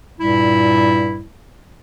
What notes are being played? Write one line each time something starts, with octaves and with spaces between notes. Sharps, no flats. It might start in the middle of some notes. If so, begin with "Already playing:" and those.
G2 A#2 G3 E4